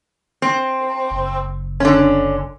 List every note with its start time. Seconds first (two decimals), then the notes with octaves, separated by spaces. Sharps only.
0.42 C4
1.11 F#1
1.80 D3 C#4